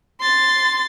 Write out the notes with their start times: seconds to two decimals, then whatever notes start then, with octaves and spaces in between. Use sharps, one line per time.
0.20 C6 A6